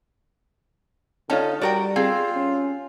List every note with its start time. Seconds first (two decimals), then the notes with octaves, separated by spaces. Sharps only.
1.30 D3 C#4 D#4 F4 C#5 A5
1.61 G3 F#4 A#4 D5 G5
1.96 C4 F4 G#4
2.35 C#4